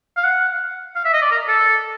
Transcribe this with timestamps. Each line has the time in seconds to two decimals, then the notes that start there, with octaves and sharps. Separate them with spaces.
0.17 F5
0.25 F#5
0.96 F5
1.05 E5
1.13 D#5
1.22 D5
1.31 A#4
1.48 A4